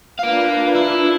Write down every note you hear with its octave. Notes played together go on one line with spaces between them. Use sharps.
D4 F4 A#4 B4 F5
E4